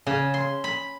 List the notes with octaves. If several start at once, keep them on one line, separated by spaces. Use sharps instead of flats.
C#3
C6
B5